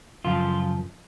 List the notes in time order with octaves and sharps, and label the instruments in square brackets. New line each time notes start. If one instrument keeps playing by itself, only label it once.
[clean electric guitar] F#2 C#3 F3 F4